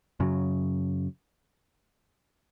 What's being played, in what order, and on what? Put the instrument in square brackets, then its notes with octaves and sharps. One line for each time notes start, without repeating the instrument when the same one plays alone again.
[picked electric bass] F#2 C#3 F#3